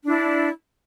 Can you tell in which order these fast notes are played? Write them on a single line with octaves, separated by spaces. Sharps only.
D4 E4 D5